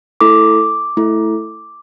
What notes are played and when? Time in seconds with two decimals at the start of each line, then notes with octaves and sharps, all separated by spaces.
0.21 A3 E4 A4 D6
0.97 A3 E4 A4